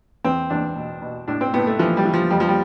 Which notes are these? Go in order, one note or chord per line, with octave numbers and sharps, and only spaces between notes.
E2 C4
E2 D4
B2
B2
A2 D4
C4
A2 B3
A3
E3 F3
G3
E3
F3
F2 G3
F3
G3